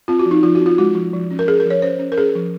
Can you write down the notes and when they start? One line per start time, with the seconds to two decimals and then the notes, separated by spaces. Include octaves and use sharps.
0.08 C4 F4
0.19 F#4
0.26 F3
0.31 D#4
0.43 F3 F4
0.55 F#4
0.61 C4
0.66 F4
0.78 G#3 F#4
0.95 F3
1.13 F3
1.31 C#4
1.39 A#4
1.47 C#4 G#4
1.60 A#4
1.65 F3
1.70 C#5
1.82 C#4 C5
1.99 C#4
2.12 A#4
2.18 C#4 G#4
2.35 F3